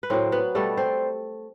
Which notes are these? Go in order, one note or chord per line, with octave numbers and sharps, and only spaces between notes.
B4
A2 F#3 C4 C5
B3 B4
B2 G3 A3 A4
C4 C5